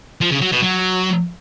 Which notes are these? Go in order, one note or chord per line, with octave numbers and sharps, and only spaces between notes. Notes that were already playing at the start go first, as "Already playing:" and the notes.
F3
C#3
F#3
B2
F#3